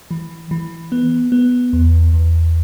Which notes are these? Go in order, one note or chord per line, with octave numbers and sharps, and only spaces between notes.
E3
E3
B3
B3
E2
E2